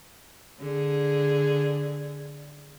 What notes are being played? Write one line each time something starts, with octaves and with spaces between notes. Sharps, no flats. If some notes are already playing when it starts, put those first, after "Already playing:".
D3 G#4